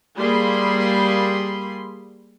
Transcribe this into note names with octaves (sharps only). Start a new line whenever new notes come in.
G3 A#3 G#4 B5 C6